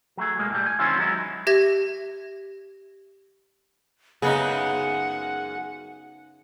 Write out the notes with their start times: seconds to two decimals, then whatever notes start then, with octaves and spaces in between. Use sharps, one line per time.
0.17 F#3 A3 G#4
0.38 B1 G#3 A#3
0.50 A2 G3
0.66 G#5
0.79 D#3 C4 C#4 E4 F4
0.98 F#3 G#3 C#4 D#4 E4
1.47 G4 E5 G#6 A#6
4.22 F#2 C#3 G#3 B3 D#4 G#4 F#5